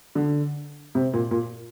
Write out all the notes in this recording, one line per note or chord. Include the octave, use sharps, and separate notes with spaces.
D3
C3
A#2
A#2